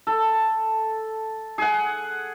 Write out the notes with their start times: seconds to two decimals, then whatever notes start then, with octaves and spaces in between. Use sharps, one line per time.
0.07 A4
1.58 G#4 F#5